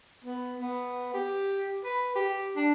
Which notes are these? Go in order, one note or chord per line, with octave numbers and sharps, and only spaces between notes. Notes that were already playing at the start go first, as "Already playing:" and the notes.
B3
B3
G4
B4
G4
D4